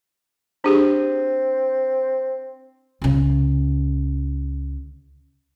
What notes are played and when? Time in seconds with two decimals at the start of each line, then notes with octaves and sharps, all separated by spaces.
0.64 C4 D4 G4 G#4
3.02 C#2 C#3